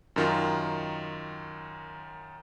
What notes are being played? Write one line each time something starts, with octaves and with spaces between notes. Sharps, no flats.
F#2 D#3 F4